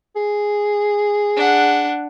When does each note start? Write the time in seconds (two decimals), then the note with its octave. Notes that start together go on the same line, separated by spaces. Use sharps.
0.16 G#4
1.36 D4 F#5